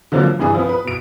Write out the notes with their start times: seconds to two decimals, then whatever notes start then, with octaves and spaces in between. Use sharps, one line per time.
0.12 D3 F3 F#3 A#3 D4
0.23 F3
0.39 C2 G2 E3 D4 G#4 D#6
0.55 F3 B3
0.69 B4
0.85 B2 D7